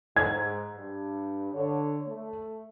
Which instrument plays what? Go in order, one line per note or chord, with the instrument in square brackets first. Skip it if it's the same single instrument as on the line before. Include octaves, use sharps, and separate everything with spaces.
[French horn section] G#2 [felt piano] G#6
[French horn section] G2
D3 C#5
A3